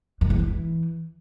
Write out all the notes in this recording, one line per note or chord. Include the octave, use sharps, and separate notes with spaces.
F#2
E2
F3
E3